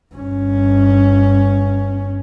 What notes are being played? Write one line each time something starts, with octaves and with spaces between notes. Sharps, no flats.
G1 C#4